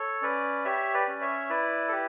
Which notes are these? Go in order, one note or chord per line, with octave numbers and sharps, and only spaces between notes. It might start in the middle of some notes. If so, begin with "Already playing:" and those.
Already playing: A4 C#5
C#4 B4 D5
G4 C#5 E5
B4 D5
C#4
C#5 E5
E4 B4 D5
A4
G4 B4